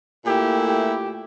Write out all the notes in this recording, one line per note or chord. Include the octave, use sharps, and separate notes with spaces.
A#2 A3 E4 G4
G4